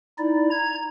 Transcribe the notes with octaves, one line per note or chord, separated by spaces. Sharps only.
D#4 E4 D5
A#5 G#6